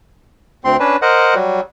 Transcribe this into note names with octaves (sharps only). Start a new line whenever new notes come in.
D2 C4 C6
C#4 D4 B4
A#4 C5 D#5 F#5
F#3 G3